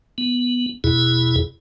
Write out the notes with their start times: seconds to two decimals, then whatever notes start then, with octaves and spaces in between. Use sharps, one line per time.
0.18 B3
0.84 E2 B2 E4 G#4